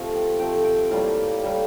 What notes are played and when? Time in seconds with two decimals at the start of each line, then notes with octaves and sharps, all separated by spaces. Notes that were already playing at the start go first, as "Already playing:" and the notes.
Already playing: C3 F3 A3 F5
0.15 G5
0.40 C3 F3 A3 G5
0.64 G5
0.91 A2 G3 A#3 F5
1.42 A2 G3 A#3